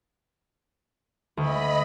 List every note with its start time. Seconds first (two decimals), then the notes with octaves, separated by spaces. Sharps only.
1.37 D2 D#5 B5